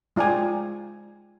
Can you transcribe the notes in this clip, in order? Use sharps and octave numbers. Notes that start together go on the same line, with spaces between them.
G#3 F4 D5 G5 G#5